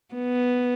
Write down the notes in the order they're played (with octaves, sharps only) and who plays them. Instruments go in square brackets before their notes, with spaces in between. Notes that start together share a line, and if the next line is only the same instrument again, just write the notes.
[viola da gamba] B3